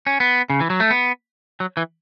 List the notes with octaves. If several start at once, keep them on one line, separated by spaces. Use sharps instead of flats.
C#4
B3
C#3
E3
F#3
A3
B3
F#3
E3